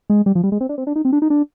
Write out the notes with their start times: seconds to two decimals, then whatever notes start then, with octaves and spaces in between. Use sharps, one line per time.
0.10 G#3
0.26 G3
0.35 F3
0.43 G3
0.52 G#3
0.61 C4
0.69 D4
0.78 C4
0.87 D4
0.96 D#4
1.05 C4
1.13 D4
1.22 D#4
1.30 D4